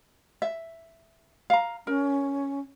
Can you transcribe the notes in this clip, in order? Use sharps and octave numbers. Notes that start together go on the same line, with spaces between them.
E5
F5 A#5
C#4 A#4